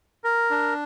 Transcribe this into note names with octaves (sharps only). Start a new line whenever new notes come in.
A#4
D4